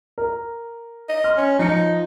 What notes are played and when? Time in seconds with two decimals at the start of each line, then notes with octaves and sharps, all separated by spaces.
0.18 A#4
1.09 D#5
1.24 C6 F6
1.37 C#4
1.59 F3 D#4 C#7